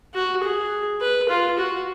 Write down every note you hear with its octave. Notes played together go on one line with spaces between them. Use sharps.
F#4
G#4
B4
F4
F#4